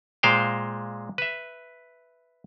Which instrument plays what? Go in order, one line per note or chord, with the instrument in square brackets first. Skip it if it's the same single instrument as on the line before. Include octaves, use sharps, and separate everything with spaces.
[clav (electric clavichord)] A#2 G#3 C5 F5 G5
B4 E5